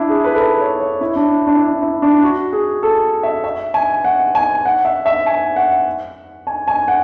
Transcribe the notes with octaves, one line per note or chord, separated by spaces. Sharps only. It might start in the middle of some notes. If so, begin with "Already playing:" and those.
Already playing: D4 E4
G#4
B4
A4
B4
C#5
C#5
E4
D4
D4
E4
D4
E4
D4
F#4
G#4
A4
E5
E5
G#5
F#5
G#5
F#5
E5
E5
G#5
F#5
G#5
G#5
F#5